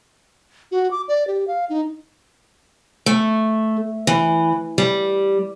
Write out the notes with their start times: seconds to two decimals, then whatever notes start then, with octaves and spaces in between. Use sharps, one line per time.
0.71 F#4
0.91 D6
1.08 D5
1.27 G4
1.48 F5
1.69 D#4
3.06 A3
4.07 E3
4.78 G3